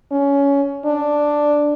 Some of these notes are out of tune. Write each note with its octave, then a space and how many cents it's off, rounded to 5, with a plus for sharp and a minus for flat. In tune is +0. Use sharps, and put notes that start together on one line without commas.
C#4 +20
D4 +5